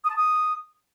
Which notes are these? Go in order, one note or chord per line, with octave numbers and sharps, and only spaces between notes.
D#6
A5
D#6